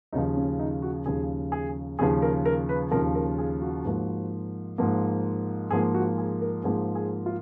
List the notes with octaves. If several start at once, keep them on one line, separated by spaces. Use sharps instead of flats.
D#2 C#3 F3 D#4
C#4
D#4
F#4
D#2 C#3 F3 G#4
G#4
D#2 C#3 F3 G#4
A#4
A#4
B4
D#2 C#3 F3 A#4
A#4
G#4
F#4
G#2 F3 A#3
G#2 F3 A#3
G#2 F3 A#3 G#4
F#4
G#4
A#4
G#2 F3 A#3 G#4
G#4
F4